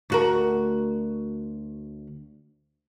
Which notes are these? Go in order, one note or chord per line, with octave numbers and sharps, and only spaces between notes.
D2 F#4 A#4